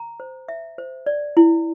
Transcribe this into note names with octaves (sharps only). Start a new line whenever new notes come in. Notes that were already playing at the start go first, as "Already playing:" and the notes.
Already playing: A#5
C5
E5
C5
D5
E4